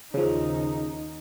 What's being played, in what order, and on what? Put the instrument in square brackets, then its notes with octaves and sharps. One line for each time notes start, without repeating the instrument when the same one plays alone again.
[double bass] D#2 D#4 [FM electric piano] C#3 F3